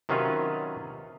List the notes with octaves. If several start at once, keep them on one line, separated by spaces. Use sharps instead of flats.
C3 D#3 F#3 C#4 F4 B4